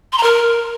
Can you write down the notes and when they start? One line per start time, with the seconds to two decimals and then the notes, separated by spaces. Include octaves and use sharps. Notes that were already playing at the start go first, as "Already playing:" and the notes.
0.13 C6
0.18 A#5
0.23 A#4